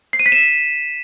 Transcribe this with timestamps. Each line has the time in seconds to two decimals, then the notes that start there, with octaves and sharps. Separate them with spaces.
0.13 C7
0.19 D#7
0.26 B6
0.32 E7